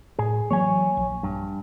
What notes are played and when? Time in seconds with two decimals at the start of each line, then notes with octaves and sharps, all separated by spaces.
0.19 A2 G#4
0.51 E3 F#3 A#3 C#5 G#5
0.97 A#1
1.23 G2